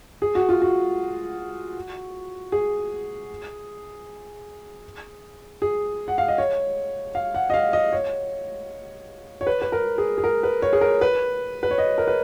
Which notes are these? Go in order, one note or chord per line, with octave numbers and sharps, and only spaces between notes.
G#4
F#4
F4
F#4
G#4
G#4
F#5
F5
D#5
C#5
F5
F#5
D#5
F5
D#5
C#5
C#5
B4
B4
A#4
G#4
G#4
A#4
B4
C#5
G#4
A#4
B4
B4
C#5
D#5
A#4
B4